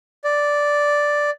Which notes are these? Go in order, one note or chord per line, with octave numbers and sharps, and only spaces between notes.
D5